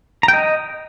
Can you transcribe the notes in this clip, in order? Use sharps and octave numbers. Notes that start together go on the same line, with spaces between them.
A#5
G5
D#5